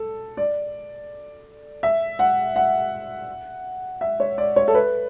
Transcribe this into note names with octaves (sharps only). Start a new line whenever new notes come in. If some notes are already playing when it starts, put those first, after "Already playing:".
Already playing: A4
D5
E5
F#5
F#5
E5
C#5
D5
C#5
A4
B4